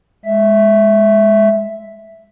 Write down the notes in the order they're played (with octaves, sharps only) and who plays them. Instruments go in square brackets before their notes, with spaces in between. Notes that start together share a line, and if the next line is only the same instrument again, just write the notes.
[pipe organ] G#3 E5